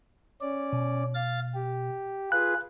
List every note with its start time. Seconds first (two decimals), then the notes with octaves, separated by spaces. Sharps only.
0.41 C#4 D5
0.73 B2
1.15 F5 A6
1.54 G4
2.32 F4 G#4 B4 F#6